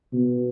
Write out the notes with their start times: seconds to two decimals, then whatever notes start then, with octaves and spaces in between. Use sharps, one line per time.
0.14 B2